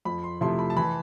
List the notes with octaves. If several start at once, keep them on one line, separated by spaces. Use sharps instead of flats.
F2 B5
C6
C3 F3 A3 E4 C6
B5
A5
E3 B5